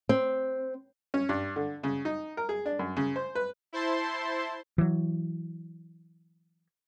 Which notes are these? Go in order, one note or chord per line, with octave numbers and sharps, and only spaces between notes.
C4
C#4
G2
D3
C#3
D#4
A#4
G#4
D4
F#2
C#3
C5
B4
E4 C5 A5 C6
E3 F#3